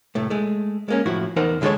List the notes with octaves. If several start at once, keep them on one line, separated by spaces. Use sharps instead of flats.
C2 A2 A3
G#3 A3
G#3 A#3 C#4
A2 F3 E4 F#4
E2 E3 D#4 A#4 C5 F#5
C#2 D3 G#3 D4 A4 C#5